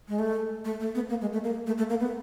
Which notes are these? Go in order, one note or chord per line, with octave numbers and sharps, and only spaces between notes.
G#3
A3
A3
A3
B3
A#3
G#3
A3
A#3
A3
A3
A#3
B3